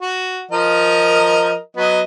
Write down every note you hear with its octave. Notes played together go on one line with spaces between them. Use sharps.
F#4
F3 A#4 D#5
F#3 B3 D#5